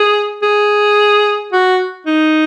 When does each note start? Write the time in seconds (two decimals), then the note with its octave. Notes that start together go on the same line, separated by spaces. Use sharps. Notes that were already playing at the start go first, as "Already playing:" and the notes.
Already playing: G#4
0.43 G#4
1.53 F#4
2.07 D#4